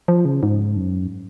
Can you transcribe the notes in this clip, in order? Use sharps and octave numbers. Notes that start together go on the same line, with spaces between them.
F3
C#3
G#2
F#2